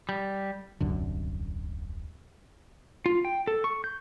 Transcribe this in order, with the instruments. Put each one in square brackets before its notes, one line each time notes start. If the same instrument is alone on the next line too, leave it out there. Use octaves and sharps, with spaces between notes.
[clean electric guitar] G3
[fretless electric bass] D#1 C2 F#2 D3
[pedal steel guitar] F4
G5
A4
C#6
G6